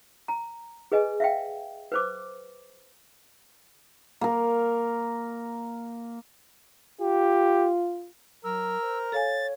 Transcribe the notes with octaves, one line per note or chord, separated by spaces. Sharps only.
A#5
G#4 B4 D#5 G#5
E5 F5 G5
B4 C5 D6
A#3 A#4
F4 G4
F#3 A#4 E6
C5
A4 C#5 F5 G#5 A6